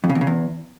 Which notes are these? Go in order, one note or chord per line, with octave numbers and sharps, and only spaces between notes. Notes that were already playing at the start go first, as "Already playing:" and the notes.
F2
C#3
E2
C#3
E2